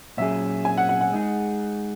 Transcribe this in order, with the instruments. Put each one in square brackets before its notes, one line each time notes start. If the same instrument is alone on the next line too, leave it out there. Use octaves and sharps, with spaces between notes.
[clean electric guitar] A#2 F#3 C#4 G#4 [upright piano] E5
[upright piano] G#5
F#5
F#5
F#5
[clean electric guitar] G#3 D#4 G#4